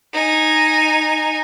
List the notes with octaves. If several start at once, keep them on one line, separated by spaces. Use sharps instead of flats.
D#4 G#5